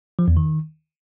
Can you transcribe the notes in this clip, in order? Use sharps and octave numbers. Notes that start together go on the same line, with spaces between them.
F3
E2
D#3